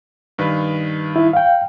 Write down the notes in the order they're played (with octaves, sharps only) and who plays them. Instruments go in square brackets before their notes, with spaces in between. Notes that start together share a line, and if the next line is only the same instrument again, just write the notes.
[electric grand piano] G2 D#3 B4
[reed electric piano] E4
F5 G5